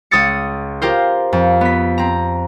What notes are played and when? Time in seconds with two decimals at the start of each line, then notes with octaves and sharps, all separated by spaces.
0.11 C#2 D#6 E6 A6 C#7
0.82 F4 G4 A#4 C5
1.33 F2
1.61 B3 B6
1.98 C4 A#5